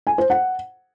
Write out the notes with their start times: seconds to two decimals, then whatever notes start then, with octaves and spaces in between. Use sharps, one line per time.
0.07 G#5
0.18 C5
0.30 F#5